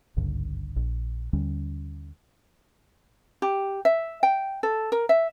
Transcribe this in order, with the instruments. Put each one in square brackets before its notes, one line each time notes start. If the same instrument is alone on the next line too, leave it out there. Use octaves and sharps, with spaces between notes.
[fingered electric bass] G#1 C#2 G2 D3
A#1
D#2 D3 G3 C#4
[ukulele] G4
E5
G5
A4
A#4
E5